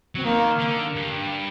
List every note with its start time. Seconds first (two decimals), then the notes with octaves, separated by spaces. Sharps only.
0.15 F#3 C4
0.23 D#3 A#3
0.59 D3
0.96 G2